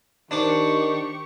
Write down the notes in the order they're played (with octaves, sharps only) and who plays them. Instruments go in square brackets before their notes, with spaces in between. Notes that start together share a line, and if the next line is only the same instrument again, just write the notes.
[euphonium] D#3 [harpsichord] D4 C5 D6 [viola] G4 C#6